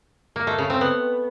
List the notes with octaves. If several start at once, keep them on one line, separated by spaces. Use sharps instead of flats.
A#3
A3
C#3
C4
B3